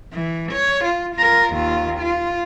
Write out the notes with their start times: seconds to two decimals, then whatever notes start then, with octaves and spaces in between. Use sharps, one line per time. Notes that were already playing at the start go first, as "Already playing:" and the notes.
0.13 E3
0.52 C#5
0.84 F4
1.16 F4 A#4
1.54 D#2 F4
2.00 F4